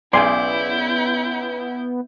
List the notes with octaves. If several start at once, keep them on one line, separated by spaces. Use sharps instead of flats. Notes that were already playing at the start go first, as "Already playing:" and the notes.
B1 C#3 B3 E4 G#4 D5 C6 G6